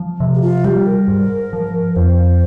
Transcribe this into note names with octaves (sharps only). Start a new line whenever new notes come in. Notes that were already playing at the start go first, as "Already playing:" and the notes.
Already playing: F3
C3
G4
F4
G3 G4
A#4
G#2
F3
F2 C5